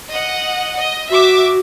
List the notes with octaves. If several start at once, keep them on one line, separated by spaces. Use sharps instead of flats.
D#5 F#5
D#5
F#4 E5 D6